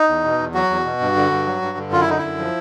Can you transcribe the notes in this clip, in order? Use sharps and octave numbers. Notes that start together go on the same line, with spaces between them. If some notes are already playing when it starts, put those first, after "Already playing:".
Already playing: D#4
E2
B2
E2
F#3 F#4
E2
B2
G2
D3
G2
F#3
G2
D3
F#2 F4
E4
D3 D#4
F#2 E4
F3